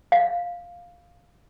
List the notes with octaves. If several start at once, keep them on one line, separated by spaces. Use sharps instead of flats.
F5